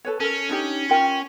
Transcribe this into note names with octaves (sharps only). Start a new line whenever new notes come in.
A4 B4 C#5
C#4 A4 A#4
D4 D#4 G4
F4 A#4 G5